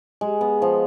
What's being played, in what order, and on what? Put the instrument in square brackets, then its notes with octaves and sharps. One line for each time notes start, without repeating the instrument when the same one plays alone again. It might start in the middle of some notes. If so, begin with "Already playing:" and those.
[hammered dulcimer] G#3
B3
F3